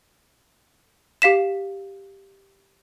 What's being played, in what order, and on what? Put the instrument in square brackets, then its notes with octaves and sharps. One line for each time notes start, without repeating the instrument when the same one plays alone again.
[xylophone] G4 F5 B6 E7